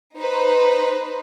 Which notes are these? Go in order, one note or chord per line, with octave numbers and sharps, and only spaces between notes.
D#4 B4 C5